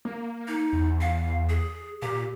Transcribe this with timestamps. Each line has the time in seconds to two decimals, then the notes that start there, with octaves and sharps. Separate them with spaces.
0.05 A#3
0.48 D#4
0.73 E2
1.01 F5
1.49 G#4
2.02 A#2 G4